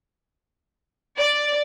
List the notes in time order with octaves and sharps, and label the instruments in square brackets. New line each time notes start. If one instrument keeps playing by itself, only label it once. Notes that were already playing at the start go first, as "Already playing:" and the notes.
[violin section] D5